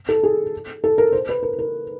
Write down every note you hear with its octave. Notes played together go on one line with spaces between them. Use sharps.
A4
G#4
A4
A#4
C5
B4
A#4
A#4